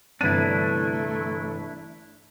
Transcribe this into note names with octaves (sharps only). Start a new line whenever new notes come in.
G1 G2 C3 E3 A3 D4 E4 D#7